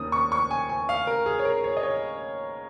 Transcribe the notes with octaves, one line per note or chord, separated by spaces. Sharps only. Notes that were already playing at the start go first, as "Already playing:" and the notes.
Already playing: D#2 D#3 A#3 C#4 D#6
C#6
C#6
G#5
G#5
F5
A#4
G#4
C#5
A#4
C#5
D#5
C#5